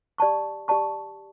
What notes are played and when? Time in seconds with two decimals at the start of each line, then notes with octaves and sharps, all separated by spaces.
0.18 G4 D5 A5 C#6
0.68 G4 D5 A5 C#6